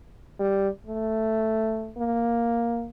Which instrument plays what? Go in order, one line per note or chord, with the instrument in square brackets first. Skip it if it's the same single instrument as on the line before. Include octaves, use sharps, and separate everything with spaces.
[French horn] G3
A3
A#3